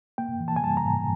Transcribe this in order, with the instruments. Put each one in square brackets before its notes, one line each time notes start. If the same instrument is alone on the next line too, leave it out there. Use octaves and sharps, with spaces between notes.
[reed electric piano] A#3 G5
E3
A5
G#5
G3 A5
A#5
G#2